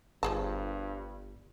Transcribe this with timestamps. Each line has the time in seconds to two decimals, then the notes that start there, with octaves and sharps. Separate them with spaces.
0.23 G1 G2 F3 G#4 A5